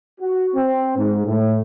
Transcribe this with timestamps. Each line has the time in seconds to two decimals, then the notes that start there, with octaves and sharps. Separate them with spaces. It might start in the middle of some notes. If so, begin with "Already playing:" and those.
0.20 F#4
0.55 C4
0.97 G#2
1.25 A2